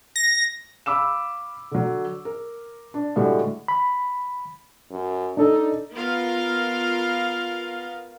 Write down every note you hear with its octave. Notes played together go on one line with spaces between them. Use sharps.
A#6
F5 B5 D6 E6 E7
D3 F#3
A#4
D4
A2 D3 G3 G#3 F#4
B5
F#2
D4 D#4 A4
B3 F4 A#4 F5